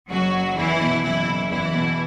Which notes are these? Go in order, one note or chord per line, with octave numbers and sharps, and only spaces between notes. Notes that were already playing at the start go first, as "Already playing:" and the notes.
F#1 F#3 F#4
F#1
E2 E3 E4
B2
F#1 E3 E4
F#1
E2 E3 E4
B2